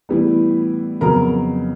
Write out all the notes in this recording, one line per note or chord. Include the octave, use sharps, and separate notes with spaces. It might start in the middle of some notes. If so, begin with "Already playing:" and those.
A2 E3 G3 B3
F2 C#3 F#3 B3 A#4 A#5